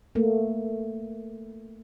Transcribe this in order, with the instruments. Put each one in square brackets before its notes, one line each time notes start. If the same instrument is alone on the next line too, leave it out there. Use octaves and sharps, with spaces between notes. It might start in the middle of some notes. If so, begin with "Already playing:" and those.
[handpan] A3 A#3